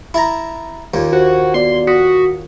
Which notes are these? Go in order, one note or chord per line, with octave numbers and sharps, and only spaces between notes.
E4 A5 A#5
D#2 A#2
F#4 C5
B3 F#4 D5 C6
F#4 D#6 B6 C#7